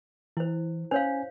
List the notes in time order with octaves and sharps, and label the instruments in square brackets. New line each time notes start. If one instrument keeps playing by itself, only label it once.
[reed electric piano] E3 [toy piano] E4 C5
[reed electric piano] C#4 G#5 [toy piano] C5 C#5 F5